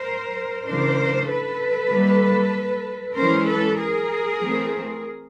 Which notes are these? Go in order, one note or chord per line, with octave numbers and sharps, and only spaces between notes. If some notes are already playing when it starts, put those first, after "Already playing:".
Already playing: A#4 C5
C#3 E3 A3 D4 A#4 C5
A4 B4
D#3 G3 A#3
E3 G#3 C#4 A#4 C5
A4 B4
G#4 A#4
E3 A3 C4